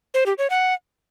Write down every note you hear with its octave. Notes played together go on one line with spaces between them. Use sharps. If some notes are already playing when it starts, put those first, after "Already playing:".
C5
G4
C#5
F#5